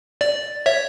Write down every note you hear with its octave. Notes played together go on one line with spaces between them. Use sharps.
D5
C#5 E5